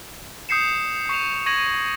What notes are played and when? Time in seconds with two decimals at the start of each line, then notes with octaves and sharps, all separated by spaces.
0.49 D#6 G6 C7 C#7 E7
1.09 C#6 C7 E7 F7
1.46 C#6 G#6 A#6 D#7 F#7